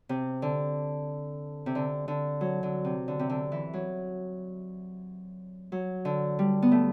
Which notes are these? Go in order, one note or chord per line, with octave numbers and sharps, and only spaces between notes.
C3
D3
C3
D3
D3
F#3
D3
C3
D3
C3
D3
E3
F#3
F#3
D3
G3
B3
A3